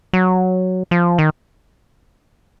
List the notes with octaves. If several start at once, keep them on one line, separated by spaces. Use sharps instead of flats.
F#3
F3
D#3